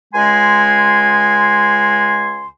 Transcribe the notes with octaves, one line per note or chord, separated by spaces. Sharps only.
C#2 G#3 G#5 C6